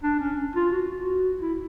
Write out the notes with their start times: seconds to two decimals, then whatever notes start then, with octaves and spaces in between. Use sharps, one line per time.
0.03 D4
0.20 C#4
0.56 F4
0.72 F#4
0.96 F#4
1.41 E4